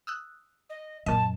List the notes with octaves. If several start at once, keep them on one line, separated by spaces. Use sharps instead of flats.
D#6 E6 F#6
D#5
F#2 A#2 D#5 A5